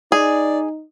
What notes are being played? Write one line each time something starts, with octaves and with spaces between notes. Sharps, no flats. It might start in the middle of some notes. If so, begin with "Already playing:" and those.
D#4 G#4 D5